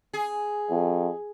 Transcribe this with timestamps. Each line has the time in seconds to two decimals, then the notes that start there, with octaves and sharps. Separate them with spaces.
0.13 G#4
0.70 F2